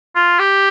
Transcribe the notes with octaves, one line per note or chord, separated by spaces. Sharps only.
F4
G4